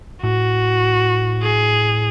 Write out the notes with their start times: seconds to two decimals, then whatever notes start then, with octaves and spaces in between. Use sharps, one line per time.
0.23 A2 F#4
1.42 G#4